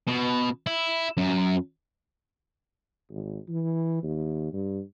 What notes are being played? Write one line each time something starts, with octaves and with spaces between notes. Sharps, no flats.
B2
E4
F#2
G#1
E3
D#2
G2